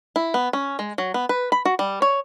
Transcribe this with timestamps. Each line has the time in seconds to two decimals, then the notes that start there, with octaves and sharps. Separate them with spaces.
0.16 E4
0.34 B3
0.53 C#4
0.79 G#3
0.98 F#3
1.14 B3
1.29 B4
1.52 B5
1.65 F#4
1.79 G3
2.02 C#5